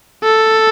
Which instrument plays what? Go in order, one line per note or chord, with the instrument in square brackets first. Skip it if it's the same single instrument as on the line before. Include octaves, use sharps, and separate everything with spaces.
[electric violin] A4